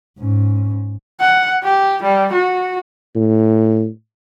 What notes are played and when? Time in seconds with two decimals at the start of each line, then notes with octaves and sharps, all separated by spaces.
0.19 G#2 C#4
1.20 F#5
1.63 G4
2.03 G3
2.32 F#4
3.16 A2